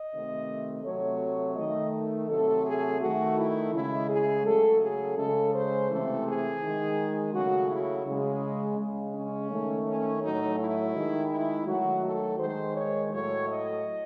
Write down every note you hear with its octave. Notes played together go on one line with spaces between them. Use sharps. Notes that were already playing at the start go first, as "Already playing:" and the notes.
Already playing: D#5
C3 D#3 A3
C3 F#3 A3 C#5
D#3 A3 D#5
C3 F#3 A3 A4
G#4
D#3 A3 F#4
E4
C#3 G#3 E4
G#4
C#3 F#3 A3 A4
G#4
C#3 G#3 A4
C5
C3 E3 A3 A4
G#4
D#3 G#3
C#3 F#3 A3 F#4
E4
C#3 G#3
C#3 G#3
C#4
D#3 A3
C#4
A2 F#3 A3 D#4
E4
D#3 G#3
E4
D#3 F#3 A3 F#4
A4
D#3 G#3 C5
C#5
A2 F#3 A3 C#5
D#5